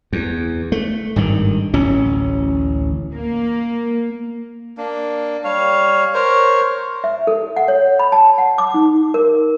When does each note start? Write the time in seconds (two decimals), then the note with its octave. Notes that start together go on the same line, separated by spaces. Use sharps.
0.13 E2
0.72 A3
1.16 G#1 G2 D#3
1.74 D1 A1 C#4
3.14 A#3
4.77 A#3 D4
5.44 G3 C#5 F5
6.14 A#4 C5 C#5
7.04 E5
7.27 A4
7.56 F#5
7.68 C#5
7.99 B5
8.12 A5
8.38 F#5
8.58 D6
8.74 D#4
9.14 A#4